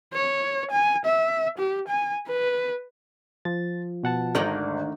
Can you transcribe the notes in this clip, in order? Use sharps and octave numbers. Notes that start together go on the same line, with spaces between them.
C#5
G#5
E5
G4
G#5
B4
F3 A6
B2 F#5 A5
G#1 D2 D#3 A#4 D5